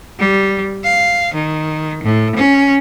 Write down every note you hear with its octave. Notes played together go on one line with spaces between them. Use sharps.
G3
F5
D#3
A2
C#4